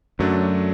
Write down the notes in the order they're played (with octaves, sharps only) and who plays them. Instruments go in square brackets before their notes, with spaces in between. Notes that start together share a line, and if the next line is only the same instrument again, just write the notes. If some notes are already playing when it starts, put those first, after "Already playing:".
[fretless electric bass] F#2 [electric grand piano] D3 F#3 A3 D4